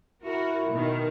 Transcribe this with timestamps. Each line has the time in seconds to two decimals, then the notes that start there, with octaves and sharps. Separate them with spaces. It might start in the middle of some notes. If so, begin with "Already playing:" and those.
0.24 E4 F#4 A#4
0.69 B2 D#3